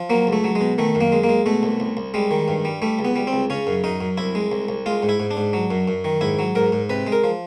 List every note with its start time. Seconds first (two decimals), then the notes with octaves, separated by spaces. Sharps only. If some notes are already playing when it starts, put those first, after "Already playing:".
Already playing: F3
0.10 F#3 A#3
0.27 C#2
0.33 A3
0.44 F#3
0.55 G#3
0.61 B2
0.78 D#3 A3
0.95 F#2
1.01 A#3
1.12 G#3
1.24 A#3
1.29 G#3
1.46 B2 A3
1.63 C2
1.80 C2
1.97 C2
2.14 G3 G#3
2.31 D#3
2.48 G2
2.65 G3
2.82 G3 A3
2.99 C#2
3.05 B3
3.16 G3
3.27 C4
3.33 C#2
3.50 C#3 C#4
3.67 F#2
3.84 F#2 D#4
4.01 F#2
4.17 C2 E4
4.35 G#3
4.52 C2
4.69 C2
4.86 G#3 F4
5.03 G#2
5.09 E4
5.20 G#2
5.31 D4
5.37 G#2
5.53 F#3
5.71 F#2
5.88 F#2
6.04 D#3
6.21 G#2 E4
6.39 F#3
6.55 G#2 A#4
6.72 G#2
6.90 C3 B4
7.07 G#3
7.12 A#4
7.24 F3